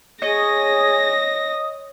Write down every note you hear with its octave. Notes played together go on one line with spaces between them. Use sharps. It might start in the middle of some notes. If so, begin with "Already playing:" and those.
G#4 C#5 D#5 A#6